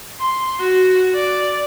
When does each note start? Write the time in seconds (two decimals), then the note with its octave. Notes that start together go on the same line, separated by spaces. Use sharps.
0.19 C6
0.60 F#4
1.16 D5